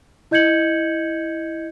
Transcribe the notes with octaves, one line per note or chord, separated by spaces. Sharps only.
E4 D#5 G6 G#6 C#7 F#7